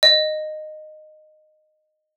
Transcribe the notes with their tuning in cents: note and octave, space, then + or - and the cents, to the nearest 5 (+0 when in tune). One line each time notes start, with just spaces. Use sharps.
D#5 -15